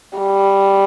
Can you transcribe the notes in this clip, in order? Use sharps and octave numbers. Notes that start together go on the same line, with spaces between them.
G3